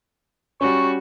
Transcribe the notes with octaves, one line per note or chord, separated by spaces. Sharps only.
G3 C#4 F#4 C#6